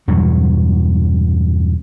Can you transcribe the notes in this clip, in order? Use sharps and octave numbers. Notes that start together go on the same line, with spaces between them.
E2 G2 B2 F#3